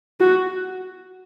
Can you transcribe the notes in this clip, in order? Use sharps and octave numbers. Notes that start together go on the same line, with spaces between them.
F#4